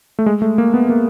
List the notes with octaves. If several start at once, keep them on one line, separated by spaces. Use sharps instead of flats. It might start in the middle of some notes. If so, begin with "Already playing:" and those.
A3
G#3
A3
A#3
B3
A#3